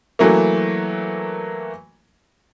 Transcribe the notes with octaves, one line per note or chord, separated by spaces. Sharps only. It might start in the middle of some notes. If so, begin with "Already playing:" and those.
E3 F#3 A3 A#3